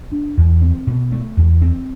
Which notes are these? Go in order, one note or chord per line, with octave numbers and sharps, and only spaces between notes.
D4
E2
C4
B2
A3
E2
C4